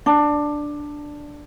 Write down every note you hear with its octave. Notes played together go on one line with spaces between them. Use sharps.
D4